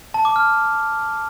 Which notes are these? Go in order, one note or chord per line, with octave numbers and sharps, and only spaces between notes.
A5
D6
F6